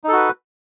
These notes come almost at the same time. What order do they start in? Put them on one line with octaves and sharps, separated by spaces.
D#4 A4 F#4 B4